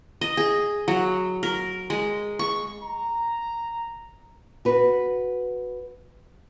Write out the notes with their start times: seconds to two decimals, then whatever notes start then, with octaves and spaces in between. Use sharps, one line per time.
0.21 D#5
0.37 G#4
0.88 F#3
1.43 A#4
1.90 G#3
2.39 C#6
2.81 A#5
4.65 F#4 B4